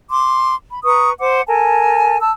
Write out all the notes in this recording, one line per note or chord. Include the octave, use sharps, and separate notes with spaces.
C6 D6
B5
B4 A#5 C#6 D#6
C5 F#5 D6
A4 A#4 G#5 A5
A5 E6